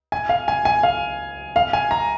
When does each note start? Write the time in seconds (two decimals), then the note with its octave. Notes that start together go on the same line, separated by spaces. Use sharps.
0.12 G#5
0.29 F5
0.48 G#5
0.65 G#5
0.83 F5
1.56 F5
1.73 G#5
1.91 A#5